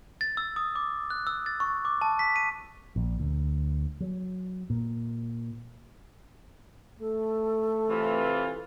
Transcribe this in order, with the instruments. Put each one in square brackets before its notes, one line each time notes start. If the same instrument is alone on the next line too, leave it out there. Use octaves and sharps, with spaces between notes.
[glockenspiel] A6
E6
D#6
D6
F#6
E6
A6
C#6
D6
A5
B6
D#7
[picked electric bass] A#1
D2
F#3
A#2
[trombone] A3 [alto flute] A4
[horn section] C3 E3 F4